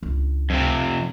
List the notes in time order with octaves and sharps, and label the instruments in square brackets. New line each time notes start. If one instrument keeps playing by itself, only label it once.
[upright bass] C#2 D4
[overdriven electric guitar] F2 C3